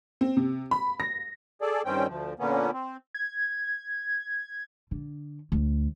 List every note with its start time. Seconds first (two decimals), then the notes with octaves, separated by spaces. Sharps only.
0.21 C4
0.37 C3
0.71 B5
1.00 A#6
1.61 G#4 A4 D5
1.85 G2 D#3 C4 C#4 G5
2.07 D2 F3
2.39 A#2 D3 A#3 B3 C#4
2.73 C4
3.14 G#6
4.91 D3
5.52 D2